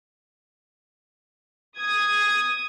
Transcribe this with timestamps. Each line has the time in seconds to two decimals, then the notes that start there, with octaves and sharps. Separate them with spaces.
1.79 D#6 G#6